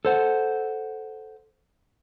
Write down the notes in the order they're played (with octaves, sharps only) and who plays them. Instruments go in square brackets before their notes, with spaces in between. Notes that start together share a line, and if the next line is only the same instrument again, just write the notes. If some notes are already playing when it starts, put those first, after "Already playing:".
[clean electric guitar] A4 C5 F#5